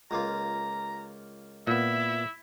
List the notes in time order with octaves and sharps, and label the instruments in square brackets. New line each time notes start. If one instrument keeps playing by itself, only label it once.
[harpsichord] C#2 A#3 F4 [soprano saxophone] A#5
[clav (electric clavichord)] A#2 B3 [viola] E4 [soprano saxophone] E5